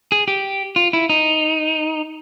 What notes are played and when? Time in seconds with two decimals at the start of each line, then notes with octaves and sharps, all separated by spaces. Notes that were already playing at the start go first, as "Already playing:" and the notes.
0.12 G#4
0.28 G4
0.76 F4
0.93 E4
1.10 D#4